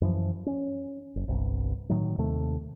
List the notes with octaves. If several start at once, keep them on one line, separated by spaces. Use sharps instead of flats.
F#2 E3 F3
C#4
F#1
G1 C2 G2
A2 D#3 F#3
D#2 C3 D#3 A3